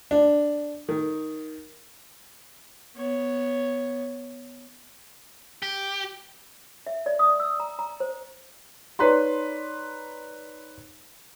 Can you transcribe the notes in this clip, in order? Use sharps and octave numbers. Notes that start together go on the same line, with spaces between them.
D4
D#3
B3 C#5
G4
E5
D5
D#6
E6
A#5
A#5
C5
D#4 B4 C#5 D5 A#5 C6